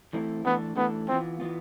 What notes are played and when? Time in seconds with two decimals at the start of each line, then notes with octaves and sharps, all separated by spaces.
0.13 E3 A3 C4 E4 A4
0.45 E3 A3 B3 D4 A4
0.76 E3 A3 B3 D4 A4
1.08 E3 B3 C4 F4
1.40 E3 B3 F4